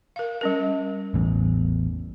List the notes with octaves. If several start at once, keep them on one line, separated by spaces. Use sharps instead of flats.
A#4 F5
G3 C#4 A#4
A1 E2